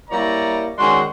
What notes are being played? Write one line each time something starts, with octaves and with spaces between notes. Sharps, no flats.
G3 A#3 E4 C#5 D5 A#5
D#3 G#3 C#4 D4 F#4 C6